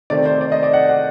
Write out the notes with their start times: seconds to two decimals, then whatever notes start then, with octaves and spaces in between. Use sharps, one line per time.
0.10 C3 D#3 A3 C4 D5
0.26 C5
0.41 D5
0.52 D#5
0.63 D5
0.74 F#5
0.89 F#5